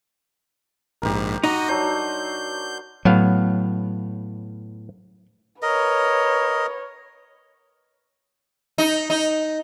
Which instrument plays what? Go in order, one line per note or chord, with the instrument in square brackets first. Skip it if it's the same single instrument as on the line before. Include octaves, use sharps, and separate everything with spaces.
[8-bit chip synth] A#1 G#2 [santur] G4 A#4
[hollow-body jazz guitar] D#4 [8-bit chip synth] F#4 D#5
[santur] F#3 D4 C5 [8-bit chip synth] G6
[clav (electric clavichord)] A2 B3 F5 [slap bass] F#3
[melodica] A#4 D#5 [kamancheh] B4 C#5
[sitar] D#4
D#4